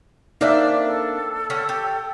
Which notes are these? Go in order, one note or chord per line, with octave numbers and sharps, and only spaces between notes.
A#3 C4 D4 D#4 D5 E5
A4
D3 C#4 G5
G4